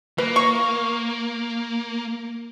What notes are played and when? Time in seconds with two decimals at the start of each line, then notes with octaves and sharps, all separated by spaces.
0.18 A#3 B4
0.36 C#6